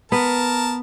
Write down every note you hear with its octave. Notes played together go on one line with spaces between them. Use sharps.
B3 A#4 A5